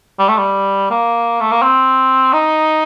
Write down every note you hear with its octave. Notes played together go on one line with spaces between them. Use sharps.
G3
A3
G3
A#3
A3
A#3
C4
D#4